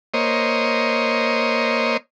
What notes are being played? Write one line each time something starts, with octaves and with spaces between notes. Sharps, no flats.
A#3 C5 C#5 D#5